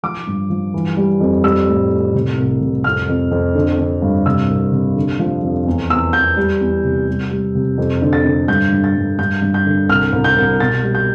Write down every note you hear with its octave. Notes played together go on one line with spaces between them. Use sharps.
F3 D6
G2
F3
E3
G3
F2
G3 E6
A2
A2
C3
C2
C3
F2 F6
F2
F2
D3
D3
G2
C3 E6
C2
C3
D3
F3
F2
E2
E2 E6
E2 G6
G3
E2
C3
G3
G3
C3
F2
D3
A6
D3
G2 G6
G2
A6
G2
G2 G6
G2
G6
D3
C2 F6
C2
G6
C2
B2 A6
G3
G6